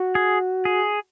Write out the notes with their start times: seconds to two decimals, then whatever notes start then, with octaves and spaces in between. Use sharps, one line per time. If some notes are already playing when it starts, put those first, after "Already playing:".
Already playing: F#4
0.15 G#4
0.65 G#4